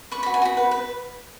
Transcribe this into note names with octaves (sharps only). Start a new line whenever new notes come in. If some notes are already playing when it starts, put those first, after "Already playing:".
B4 C#6
F#4 B5
G#5
F#4 B5
B4
B4